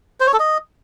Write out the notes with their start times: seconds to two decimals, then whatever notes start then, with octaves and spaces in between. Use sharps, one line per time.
0.20 C5
0.27 C#5
0.33 A4
0.39 D#5